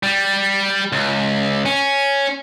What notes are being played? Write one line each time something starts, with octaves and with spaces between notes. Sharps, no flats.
G3
C#2
C#4